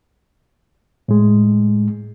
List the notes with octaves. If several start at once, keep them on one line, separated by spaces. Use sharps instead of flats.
A2 G#3